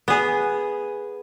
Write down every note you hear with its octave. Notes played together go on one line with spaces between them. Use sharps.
B3 G#4